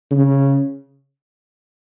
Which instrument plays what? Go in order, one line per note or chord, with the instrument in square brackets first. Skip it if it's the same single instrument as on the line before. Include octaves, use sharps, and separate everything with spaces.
[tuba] C#3